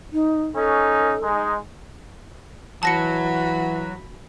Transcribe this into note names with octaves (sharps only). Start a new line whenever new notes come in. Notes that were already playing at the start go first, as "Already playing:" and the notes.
D#4
C#4 D#4 A4
G#3 D#4
E3 F#3 F#4 A5 B5 A#6 C#7